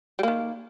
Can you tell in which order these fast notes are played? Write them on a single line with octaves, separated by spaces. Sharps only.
G3 A#3 D#3